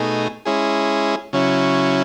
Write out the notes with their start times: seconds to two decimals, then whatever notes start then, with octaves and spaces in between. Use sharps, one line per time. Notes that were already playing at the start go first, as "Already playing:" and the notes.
Already playing: B2 A3 D#4 G#4
0.45 G#3 C#4 E4 G#4
1.33 C#3 F#3 C#4 E4